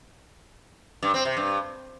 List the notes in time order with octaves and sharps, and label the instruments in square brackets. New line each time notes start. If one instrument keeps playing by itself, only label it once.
[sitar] G2
C4
C3
G2